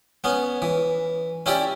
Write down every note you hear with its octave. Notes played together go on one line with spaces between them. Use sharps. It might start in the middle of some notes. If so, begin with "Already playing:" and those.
B3 C#4
E3
C#4 E4 G4 D5